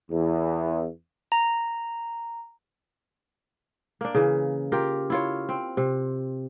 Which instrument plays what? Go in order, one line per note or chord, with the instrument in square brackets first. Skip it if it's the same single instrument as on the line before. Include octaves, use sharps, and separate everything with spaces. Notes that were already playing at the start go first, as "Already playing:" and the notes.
[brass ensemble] E2
[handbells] A#5
[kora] A#3 D4
C#3 E3
F4 G4 A#4
E4 F4 C#5
C4
C3